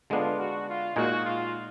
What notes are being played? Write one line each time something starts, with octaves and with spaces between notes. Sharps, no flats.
D3 G#3 B3 D4 F4
F#4
F4
A#2 G#3 D#4 F#4 G#4
F4